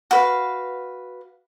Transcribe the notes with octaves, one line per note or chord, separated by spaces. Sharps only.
F#4 B4 F5